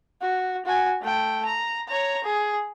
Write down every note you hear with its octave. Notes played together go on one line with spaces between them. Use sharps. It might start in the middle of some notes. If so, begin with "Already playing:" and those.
F#4
F#4 G#5
A3 G5
A#5
C#5 A#5
G#4